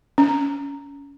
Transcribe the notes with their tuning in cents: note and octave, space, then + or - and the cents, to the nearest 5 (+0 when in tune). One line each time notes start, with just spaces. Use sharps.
C#4 +25